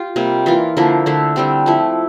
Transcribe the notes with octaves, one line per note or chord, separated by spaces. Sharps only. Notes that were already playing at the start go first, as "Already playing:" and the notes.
Already playing: F4 G4
C3 G3 A#3
E3 A#3 F4
D3 F3 A#3 E4
D3 A3 E4
D3 G3 C4
F3 A3 E4